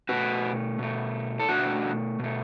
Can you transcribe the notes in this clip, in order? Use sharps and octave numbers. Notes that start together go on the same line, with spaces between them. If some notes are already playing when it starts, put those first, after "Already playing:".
B2 A3 F#4 B4
B2 A3
A4
B2 A3 D4 F#4
B2 A3